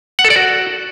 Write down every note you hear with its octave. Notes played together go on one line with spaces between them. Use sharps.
F#5
A4
D5
F#4